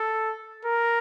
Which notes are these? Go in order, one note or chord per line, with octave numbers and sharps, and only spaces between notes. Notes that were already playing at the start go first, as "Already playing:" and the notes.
Already playing: A4
A#4